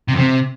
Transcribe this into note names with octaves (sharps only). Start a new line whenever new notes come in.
C3
F2
C3